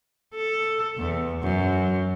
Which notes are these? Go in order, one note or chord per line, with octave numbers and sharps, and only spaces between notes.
A4
E2
F#2